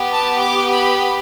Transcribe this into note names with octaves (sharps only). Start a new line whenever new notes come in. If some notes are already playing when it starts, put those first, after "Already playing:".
Already playing: B3 G4
A5
D6
B5